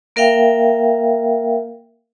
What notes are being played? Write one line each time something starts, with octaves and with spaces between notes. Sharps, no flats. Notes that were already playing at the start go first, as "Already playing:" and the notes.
A#3 A#4 E5 F5 G5